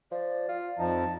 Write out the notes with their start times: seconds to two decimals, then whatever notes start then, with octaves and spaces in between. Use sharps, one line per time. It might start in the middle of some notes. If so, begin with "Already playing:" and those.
0.11 F3 D5
0.49 F4
0.79 F2 F3 D#4 A5